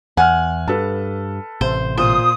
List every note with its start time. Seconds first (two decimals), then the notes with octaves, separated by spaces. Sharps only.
0.17 E2 F#5 G#5 F6
0.68 G2 A4 B4 A5
1.61 A1 C3 C5
1.98 A#2 C5 D#6